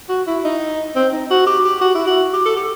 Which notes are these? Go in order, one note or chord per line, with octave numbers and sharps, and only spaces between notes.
F#4
E4
D#4
C4
D#4
F#4
G4
G4
F#4
E4
F#4
G4
A4
G4